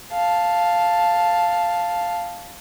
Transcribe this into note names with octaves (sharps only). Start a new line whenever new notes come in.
F5 A5